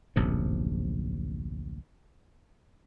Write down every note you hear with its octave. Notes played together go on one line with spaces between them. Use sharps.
D1 A#1 F#2 C3